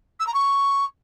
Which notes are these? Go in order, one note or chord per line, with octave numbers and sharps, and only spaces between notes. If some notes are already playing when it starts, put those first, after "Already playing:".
E6
A#5
C#6